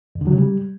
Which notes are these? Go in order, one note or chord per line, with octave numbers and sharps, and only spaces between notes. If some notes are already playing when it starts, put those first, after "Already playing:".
E2
D3
F#3
C#3
G3